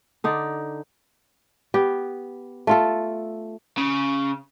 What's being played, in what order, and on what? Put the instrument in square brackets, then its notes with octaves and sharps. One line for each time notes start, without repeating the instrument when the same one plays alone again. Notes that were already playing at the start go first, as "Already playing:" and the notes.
[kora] D3 D#4 D5
B3 G4
A3 F4 A4
[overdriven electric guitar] C#3